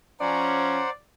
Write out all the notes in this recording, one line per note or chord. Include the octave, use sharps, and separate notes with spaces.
F3 C#4 C5 D5 F#5 A#5